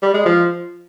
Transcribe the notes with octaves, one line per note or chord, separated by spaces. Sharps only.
G3
G#3
F3